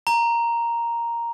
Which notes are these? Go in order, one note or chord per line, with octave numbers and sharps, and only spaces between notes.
A#5